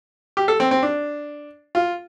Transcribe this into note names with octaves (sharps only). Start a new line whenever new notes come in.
G4
A4
C4
C4
D4
F4